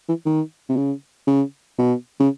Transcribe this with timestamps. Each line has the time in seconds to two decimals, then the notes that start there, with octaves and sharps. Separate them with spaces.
0.08 E3
0.26 D#3
0.69 C3
0.77 C#3
1.27 C#3
1.79 B2
2.20 C#3